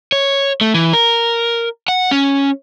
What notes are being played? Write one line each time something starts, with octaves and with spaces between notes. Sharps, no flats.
C#5
A3
E3
A#4
F#5
C#4